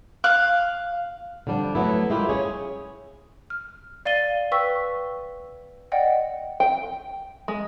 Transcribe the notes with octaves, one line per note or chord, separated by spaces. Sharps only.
F5 F#6
D3 F3 G3 D4
F#3 A3 B3 E4
G#3 A#3 E4 F4 G4
C#4 G#4 C#5
F6
D5 F5 A6 D#7 G7
B4 G5 C#6 E6 B6
D5 D#5 F#5 G5
G5
G#3